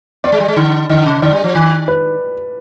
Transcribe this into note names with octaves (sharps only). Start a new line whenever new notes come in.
B3 D5
G#3
G3
G#3
D3
D3 D#5
C3
D3 D5
G3
F3
D#3
B4